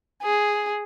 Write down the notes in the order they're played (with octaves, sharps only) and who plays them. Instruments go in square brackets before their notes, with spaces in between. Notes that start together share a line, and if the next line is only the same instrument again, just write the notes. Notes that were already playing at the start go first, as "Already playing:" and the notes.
[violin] G#4